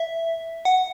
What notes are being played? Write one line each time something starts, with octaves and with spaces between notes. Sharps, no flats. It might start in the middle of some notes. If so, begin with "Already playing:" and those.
Already playing: E5
F#5